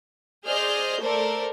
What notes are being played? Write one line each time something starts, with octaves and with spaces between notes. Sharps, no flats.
G#4 C5 D5 D#5 F6 G6
A3 A4 A#4 C5 D5